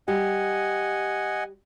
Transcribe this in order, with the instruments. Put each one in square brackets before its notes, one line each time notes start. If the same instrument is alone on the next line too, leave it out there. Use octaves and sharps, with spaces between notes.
[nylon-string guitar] G3 G4 [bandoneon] D#5 F#5 G#5